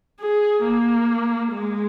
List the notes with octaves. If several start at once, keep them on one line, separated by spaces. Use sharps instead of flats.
G#4
A#3
G#3